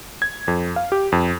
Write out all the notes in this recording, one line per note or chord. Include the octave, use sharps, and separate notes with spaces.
G#6
F2
F5
G4
F2